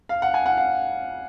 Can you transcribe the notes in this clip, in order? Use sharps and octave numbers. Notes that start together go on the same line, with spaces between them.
F5
F#5
G#5
F#5
F5